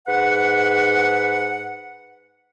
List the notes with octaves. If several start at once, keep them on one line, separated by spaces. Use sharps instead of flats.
G#2 B4 F#5